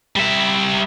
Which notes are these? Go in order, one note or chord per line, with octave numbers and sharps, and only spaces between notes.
G3 E5